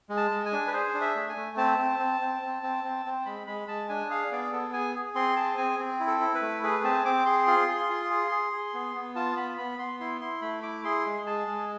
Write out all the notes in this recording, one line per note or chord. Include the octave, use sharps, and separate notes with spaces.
G#3
A5
G#3
G#5
D4
B4
G#4 C5
D4
E5
A3
G#5
A3
C4 A5
C4
C4
C4
C4
C4
C4
C4
G#3 B5
G#3 B5
G#3 A5
D4 G#5
G#4 F5
B3 D5
B3 A4
G#4 G#5
G#4
C4 C6
G#4 A5
C4 G#5
C4
E4
A4
E4
B4
A3
G#4 B4
C4 A5
C4 D6
G#4 C6
F4
G#4
F4
G#4
G#4
G#4
B3
B3
F4 A5
B3 B5
B3 B5
B3 C6
E4 C6
E4 C6
A3 B5
E4 D6
G#4 C6
G#3
G#4 A5
G#3